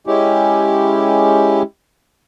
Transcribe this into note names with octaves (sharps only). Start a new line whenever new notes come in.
G#3 C#4 E4 G4